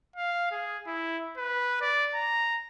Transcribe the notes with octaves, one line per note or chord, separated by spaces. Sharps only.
F5
G#4
E4
B4
D5
A#5